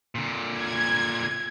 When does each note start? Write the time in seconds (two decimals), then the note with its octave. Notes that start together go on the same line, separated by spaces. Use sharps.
0.15 A#2 D3
0.58 G#6